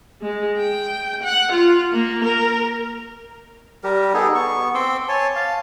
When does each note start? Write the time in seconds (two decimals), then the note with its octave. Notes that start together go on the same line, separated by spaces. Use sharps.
0.21 G#3
0.58 G5
1.23 F#5
1.52 F4
1.93 A#3
2.24 A#4
3.84 G3 G4 A#4
4.14 B3 D#4 G#4 A4
4.35 B3 C#6
4.75 C4 C6 D6 E6
5.09 C#5 G#5 A5
5.36 F5 A5